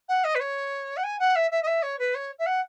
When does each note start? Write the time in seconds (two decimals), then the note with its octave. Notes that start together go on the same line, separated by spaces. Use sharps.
0.08 F#5
0.24 D#5
0.35 B4
0.40 C#5
0.96 F#5
1.03 G#5
1.19 F#5
1.35 E5
1.51 E5
1.62 D#5
1.66 E5
1.82 C#5
1.98 B4
2.14 C#5
2.38 E5
2.46 F#5